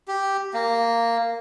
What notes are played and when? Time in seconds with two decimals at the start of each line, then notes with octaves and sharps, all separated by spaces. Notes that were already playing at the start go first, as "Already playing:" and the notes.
0.08 G4
0.54 A#3